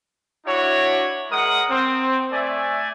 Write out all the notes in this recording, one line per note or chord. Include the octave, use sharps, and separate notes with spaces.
D4 E4 F#4 C#5
G#3 A#4 F#5 D#6
C4
A3 D5 E5 G#5